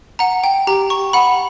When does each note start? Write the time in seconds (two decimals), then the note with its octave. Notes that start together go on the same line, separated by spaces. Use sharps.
0.19 F#5 A#5
0.44 G5
0.67 G4 A#5
0.90 C#6
1.13 F#5 B5